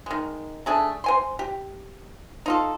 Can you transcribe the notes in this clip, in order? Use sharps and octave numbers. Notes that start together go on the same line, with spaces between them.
D#3 G#3
A3 D4 G#4 A4
C5 G#5 C6
G4
D#4 F4 A4